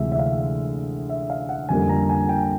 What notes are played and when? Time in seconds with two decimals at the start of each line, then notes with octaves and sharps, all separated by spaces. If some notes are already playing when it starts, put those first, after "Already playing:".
Already playing: D2 C3 E3 G#3 E5
0.12 E5
0.19 F5
1.09 E5
1.30 F5
1.49 F#5
1.69 F2 D3 G3 A#3 G#5
1.89 A#5
2.09 G#5
2.29 G5